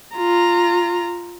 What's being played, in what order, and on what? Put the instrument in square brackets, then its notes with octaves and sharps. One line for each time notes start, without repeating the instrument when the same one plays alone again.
[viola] F4 A#5